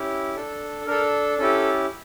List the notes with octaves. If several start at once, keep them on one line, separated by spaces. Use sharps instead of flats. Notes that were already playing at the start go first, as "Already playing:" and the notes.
Already playing: C#4 E4 G4
D4 A4
D4 A4 A#4
C#4 E4 G4 A4